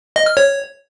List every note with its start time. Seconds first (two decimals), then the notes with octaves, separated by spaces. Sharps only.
0.16 D#5
0.26 F6
0.37 C#5